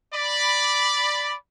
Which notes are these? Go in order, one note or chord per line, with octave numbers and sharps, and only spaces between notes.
D5 B5